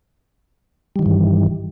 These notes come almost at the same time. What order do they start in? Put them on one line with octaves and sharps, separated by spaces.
G3 D#3 E3 G2